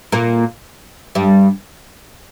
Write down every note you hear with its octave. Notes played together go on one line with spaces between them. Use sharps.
A#2 A#3
G2 G3